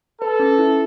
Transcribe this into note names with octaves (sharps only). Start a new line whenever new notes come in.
A4 B4
C#4
E4